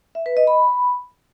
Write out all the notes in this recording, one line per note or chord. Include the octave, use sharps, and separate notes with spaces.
E5
B4
D#5
B5